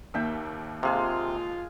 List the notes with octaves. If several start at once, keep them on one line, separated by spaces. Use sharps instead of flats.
D#2 A#3 E5 G5
C3 G#3 F4 G#4 F5